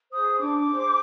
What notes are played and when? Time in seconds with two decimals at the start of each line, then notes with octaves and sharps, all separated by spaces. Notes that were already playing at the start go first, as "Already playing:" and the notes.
0.12 G#4 C5 D#6
0.40 D4 D6
0.68 G#4 C5